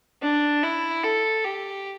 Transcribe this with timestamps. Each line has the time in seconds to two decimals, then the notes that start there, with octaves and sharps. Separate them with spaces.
0.22 D4
0.63 E4
1.03 A4
1.44 G4